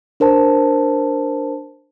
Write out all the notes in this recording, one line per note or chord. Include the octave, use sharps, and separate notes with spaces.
D4 A#4 C5 A5